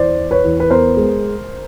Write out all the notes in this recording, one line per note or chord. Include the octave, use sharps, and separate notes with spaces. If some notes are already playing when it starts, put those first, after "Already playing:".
Already playing: E2 C5 D5
E3
B4 C#5
E2
B4
B3 A#4 C5
G#3